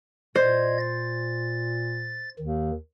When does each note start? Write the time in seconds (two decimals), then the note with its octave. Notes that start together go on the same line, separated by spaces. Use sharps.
0.35 A#2 C5 D5 D#5 G#6
0.80 A6
2.39 D#2 D#3